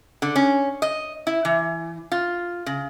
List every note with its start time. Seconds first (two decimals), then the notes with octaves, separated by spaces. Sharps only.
0.22 D3
0.36 C#4
0.82 D#5
1.27 E4
1.45 E3
2.12 F4
2.66 C#3